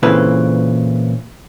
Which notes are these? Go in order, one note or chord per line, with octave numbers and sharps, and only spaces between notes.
A#2 C#3 E3 C4 A4 B4